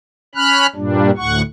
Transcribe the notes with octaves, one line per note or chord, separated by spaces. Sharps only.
C#4 B5 F6 F#6
G2 A#2 G3 D4
D2 A2 F#5 C#6